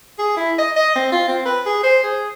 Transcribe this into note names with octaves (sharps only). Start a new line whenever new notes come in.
G#4
E4
D#5
D#5
C4
F4
C4
B4
G#4
C5
G#4